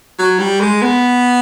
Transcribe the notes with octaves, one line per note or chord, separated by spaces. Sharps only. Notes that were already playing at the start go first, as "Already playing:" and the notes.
F#3
G3
G#3
B3